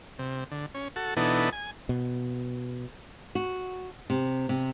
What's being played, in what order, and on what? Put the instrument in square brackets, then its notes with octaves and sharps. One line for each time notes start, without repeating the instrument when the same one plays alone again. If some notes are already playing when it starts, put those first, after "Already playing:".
[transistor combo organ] C3
D3
C#4
F#4 A4
B2 E3 B3 D4 D#4 A4
G#5
[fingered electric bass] B2
[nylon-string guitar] F#4
C3
C3